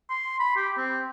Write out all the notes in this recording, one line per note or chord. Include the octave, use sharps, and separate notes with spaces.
C6
B5
G4
C4